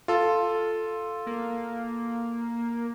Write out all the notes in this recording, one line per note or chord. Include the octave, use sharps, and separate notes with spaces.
F4 A4
A#3